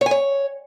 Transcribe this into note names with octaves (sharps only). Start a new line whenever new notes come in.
C#5
G#5
C#5